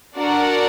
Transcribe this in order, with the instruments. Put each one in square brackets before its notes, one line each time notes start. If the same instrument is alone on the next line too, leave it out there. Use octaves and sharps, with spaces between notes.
[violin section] D4 F#4 A#4 D5 F#5